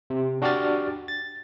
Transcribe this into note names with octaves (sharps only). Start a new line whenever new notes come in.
C3
D4 F#4 G4 D5 F6 A6
A6